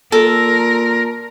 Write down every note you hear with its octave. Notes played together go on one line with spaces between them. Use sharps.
A#2 A4 A#4